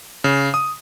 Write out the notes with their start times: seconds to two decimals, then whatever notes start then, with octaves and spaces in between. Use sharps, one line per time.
0.24 C#3
0.54 D#6